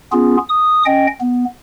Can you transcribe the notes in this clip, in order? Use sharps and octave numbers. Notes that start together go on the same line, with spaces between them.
B3 C#4 F4 G#4
D#6
C#4 D#5 G5
B3